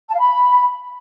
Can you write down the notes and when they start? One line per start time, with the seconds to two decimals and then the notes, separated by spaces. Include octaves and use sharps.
0.09 A5
0.14 F5
0.20 B5